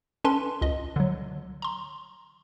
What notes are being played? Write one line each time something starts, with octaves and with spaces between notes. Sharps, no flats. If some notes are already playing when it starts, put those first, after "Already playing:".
C#4 A4 B4 A5 C6
C#2 D#5
D3 F#3
A#5 C6